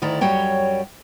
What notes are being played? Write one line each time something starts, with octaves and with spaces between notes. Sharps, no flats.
D2 D#3 E4 D5 A#5
F#2 G3 F#4 C#5 G5